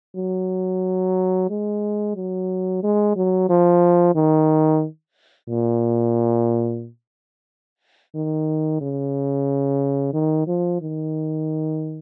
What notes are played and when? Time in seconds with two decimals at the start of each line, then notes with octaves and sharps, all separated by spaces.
0.16 F#3
1.50 G#3
2.16 F#3
2.83 G#3
3.16 F#3
3.49 F3
4.15 D#3
5.49 A#2
8.15 D#3
8.81 C#3
10.14 D#3
10.47 F3
10.81 D#3